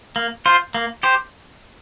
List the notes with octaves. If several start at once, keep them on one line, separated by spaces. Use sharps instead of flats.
A#3
F4 C5
A#3
G4 C5